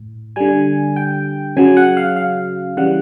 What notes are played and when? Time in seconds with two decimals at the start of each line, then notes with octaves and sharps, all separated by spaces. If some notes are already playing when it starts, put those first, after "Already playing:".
Already playing: A2
0.36 D3 G3 G#5
0.96 G5
1.57 C#3 F#3 G#5
1.77 F#5
1.97 F5
2.16 F5
2.77 C#3 E3 G3 F#5